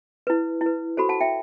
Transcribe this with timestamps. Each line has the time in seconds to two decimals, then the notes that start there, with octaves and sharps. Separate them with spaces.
0.27 E4 B4
0.61 E4 B4
0.97 F#4 A4 C5 B5
1.09 F#5 A5
1.20 E5 G5